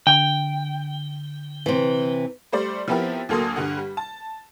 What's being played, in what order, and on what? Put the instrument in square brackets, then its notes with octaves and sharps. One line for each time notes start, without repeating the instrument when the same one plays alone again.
[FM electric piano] D3 [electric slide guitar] G5
[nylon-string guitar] C3 E3
[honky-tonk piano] G3 A3 C5 D5
F3 B3 C4 E4 G4 A#4
D2 F#3 A#3 A4 C6 D#6
G2 D3 F#5
G3
A5